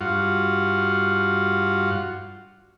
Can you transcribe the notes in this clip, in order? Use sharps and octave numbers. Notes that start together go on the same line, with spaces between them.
G2 F4 F#4